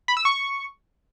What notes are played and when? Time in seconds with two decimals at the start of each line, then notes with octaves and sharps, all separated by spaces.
0.08 B5
0.17 E6
0.25 C#6